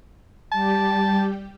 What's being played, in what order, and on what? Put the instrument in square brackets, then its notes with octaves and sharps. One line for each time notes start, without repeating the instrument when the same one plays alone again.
[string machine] G3 G4 [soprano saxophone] A5